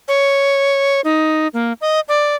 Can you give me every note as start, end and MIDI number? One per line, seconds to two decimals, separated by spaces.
0.08 1.01 73
1.04 1.48 63
1.54 1.73 58
1.81 2.00 75
2.08 2.36 74